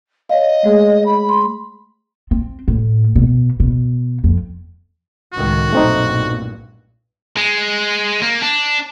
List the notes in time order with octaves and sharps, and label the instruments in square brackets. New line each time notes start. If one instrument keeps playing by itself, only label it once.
[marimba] C#5 F5 [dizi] D#5
[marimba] G#3 A3 G#4
[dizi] B5
[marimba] C6
[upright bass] C4
A2
B2
B2
F2
[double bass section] C#2 A2 D#3 [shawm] F#4
[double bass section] B1 G2 A#2 [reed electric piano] A3 C4 D#4
[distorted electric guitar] G#3
A#3
D4